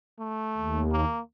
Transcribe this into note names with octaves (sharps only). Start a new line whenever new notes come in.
A3
D#2
A#3